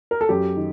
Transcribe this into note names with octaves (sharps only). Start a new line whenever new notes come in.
A#4
A4
F#2 G4
D#3